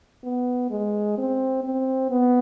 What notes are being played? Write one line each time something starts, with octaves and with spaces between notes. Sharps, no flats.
B3
G#3
C4
C4
B3